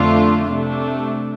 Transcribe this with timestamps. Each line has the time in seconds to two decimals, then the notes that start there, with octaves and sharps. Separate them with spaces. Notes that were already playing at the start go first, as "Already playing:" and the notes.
Already playing: F2 D3 A3 D4 F4
0.48 C3 A3 D4